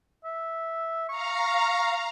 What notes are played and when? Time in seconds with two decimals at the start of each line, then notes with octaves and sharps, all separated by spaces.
0.25 E5
1.09 F5 A#5 C#6